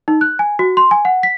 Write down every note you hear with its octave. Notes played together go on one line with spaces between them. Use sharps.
D#4
F#6
G#5
F#4
C6
G#5
F#5
B6